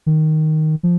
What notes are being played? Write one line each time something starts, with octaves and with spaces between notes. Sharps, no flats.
D#3
F3